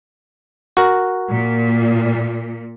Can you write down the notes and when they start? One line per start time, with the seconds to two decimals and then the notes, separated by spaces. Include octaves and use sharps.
0.77 F#4 A#4
1.32 A#2